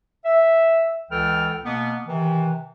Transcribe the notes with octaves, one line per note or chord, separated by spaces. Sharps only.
E5
C#2 E3 A4 G5 F6
B2 A#3 B3
C3 D#3 E3